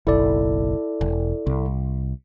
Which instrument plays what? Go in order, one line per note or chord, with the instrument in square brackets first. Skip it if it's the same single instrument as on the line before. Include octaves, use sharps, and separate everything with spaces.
[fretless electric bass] F#1 B1 [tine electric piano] E4 A4 D5
[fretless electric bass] E1
C2